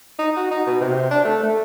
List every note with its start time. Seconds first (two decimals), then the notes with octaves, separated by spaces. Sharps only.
0.19 D#4
0.37 F#4
0.51 D#4
0.67 B2
0.81 C3
1.11 D4
1.25 A3
1.43 A3